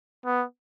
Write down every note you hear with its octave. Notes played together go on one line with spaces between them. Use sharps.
B3